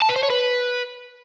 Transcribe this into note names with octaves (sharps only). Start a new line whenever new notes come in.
A5
B4
C5
C#5
B4